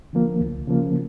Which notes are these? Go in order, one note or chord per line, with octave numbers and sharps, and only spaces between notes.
D3 F3 A#3
C#2
C#3 F3 A#3